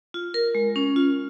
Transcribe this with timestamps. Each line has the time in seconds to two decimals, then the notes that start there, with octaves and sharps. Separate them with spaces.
0.14 F4
0.34 A#4
0.55 G#3
0.76 C#4
0.96 F4